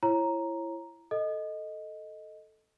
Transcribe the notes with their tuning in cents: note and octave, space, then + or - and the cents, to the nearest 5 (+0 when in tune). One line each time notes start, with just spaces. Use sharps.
E4 +25 C#5 -30 A#5 +0
A4 +0 D#5 +0